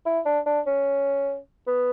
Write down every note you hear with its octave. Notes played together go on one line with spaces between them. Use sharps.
E4
D4
D4
C#4
B3